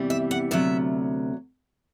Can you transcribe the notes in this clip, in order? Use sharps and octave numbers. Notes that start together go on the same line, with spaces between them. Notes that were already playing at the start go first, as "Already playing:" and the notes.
Already playing: E2 C3 E3 G3
E5
F#5
D2 C3 F#3 E5